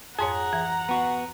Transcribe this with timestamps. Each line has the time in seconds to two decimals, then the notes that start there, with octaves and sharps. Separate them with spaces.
0.19 F2 G#2 G#4 C#5 F#5 A#5
0.53 E3
0.89 B3 F#4